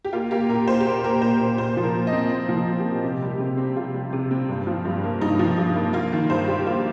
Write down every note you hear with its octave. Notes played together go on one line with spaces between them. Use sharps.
G4
A#3 F4
A#3 G4
A#2 A#4
A#2 C5
G4
A#3 A#4
A#3 A#4
A#2 C5
A#2
A#2 C5
F3
A#4
A#2
D#5
C4
A#2 C5
F3
A#4
A#2
G4
C4
C3 G4
G3
C3
C4
C3 F4
G3
C3
C4
G2
F3
G2
A#3
G2 D#4
F3
G2
A#3
A#3 F4
D#3
G2 C5
G3 G4
G4
A#3 F4